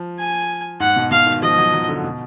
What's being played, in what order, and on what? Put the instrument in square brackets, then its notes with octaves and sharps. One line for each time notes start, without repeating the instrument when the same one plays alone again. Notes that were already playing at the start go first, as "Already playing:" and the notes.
Already playing: [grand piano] F3
[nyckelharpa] G#5
[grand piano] G#2 [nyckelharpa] F#5
[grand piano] B2
[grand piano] B2 [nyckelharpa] F5
[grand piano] D#3
[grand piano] F3 [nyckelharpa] D#5
[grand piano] F#3
F#3
D3
B2